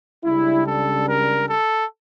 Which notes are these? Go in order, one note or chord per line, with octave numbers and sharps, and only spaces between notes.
C#2 C#3 G3 D4 E4
A4
A#4
A4